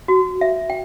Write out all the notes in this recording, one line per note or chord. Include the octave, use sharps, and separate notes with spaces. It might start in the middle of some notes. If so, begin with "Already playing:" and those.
F#4
E5
G5